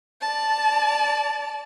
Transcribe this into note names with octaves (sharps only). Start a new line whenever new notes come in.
D5 A5